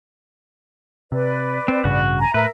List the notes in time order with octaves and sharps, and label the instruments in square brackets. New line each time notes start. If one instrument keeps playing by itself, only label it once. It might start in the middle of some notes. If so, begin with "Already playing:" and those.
[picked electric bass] C3 [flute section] B4 D5
[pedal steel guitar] C4
[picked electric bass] A1 G2 C#3 [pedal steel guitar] F#4 F#5
[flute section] G#5 A#5
[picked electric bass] A2 [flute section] A#4 E5 [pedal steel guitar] B4